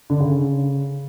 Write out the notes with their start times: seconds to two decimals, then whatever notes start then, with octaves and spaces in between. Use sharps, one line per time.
0.10 D3
0.20 C#3